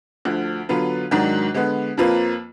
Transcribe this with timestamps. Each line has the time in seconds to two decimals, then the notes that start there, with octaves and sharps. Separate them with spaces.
0.25 D2 D3 F3
0.69 D3 F#3 B3 F4 B4
1.11 G#2 D#3 F#3 D4 F#4
1.54 D3 G#3 B3
1.97 F2 F3 A#3 F4 B4